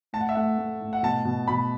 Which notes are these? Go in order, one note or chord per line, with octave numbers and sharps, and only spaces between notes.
A2 A5
F#5
E5
A3 F#5
A3
A2
F#5
B2 A5
B2
B2 B5